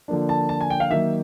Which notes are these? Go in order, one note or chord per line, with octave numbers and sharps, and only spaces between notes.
D3 F3 A#3 D4
A5
A5
G#5
G5
F5
D#3 F#3 A#3 E5